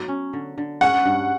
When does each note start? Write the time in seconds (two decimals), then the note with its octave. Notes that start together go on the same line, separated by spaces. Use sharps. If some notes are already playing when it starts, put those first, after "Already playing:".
Already playing: F#3 B3
0.08 C#4
0.33 D3
0.58 D3
0.81 C#4 F#5
1.05 G2